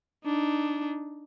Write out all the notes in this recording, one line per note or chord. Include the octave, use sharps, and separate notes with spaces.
D4 D#4